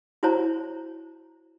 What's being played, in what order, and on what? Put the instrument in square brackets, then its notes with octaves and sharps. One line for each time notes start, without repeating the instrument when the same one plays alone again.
[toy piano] E4 F#4 C5 C#5 A5 A#5